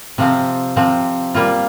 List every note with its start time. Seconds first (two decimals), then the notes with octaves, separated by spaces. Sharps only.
0.18 C3 F3 C4
0.76 C3 F3 C4
1.35 G3 A#3 F4